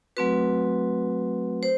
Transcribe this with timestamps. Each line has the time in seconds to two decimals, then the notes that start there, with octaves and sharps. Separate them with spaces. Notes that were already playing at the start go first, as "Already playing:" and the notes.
0.17 F#3 A3 C4 F#4 B4
1.63 C5